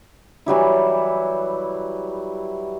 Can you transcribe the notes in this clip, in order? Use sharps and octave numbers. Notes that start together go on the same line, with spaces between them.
E3 F#3 G3 E4